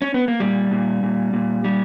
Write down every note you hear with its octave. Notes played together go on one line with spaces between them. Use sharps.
C#4
B3
A#3
A#2 G3
A#2
A#2
A#2
G3